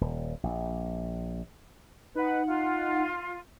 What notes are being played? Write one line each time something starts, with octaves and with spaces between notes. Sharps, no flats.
D#1
A#1
D#4 B4 F#5
F4